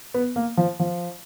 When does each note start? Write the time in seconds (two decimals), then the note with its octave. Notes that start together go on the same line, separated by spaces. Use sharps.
0.14 B3
0.36 A#3
0.57 F3
0.79 F3